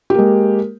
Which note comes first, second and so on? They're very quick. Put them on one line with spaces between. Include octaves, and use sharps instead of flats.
G4 A#3 G#3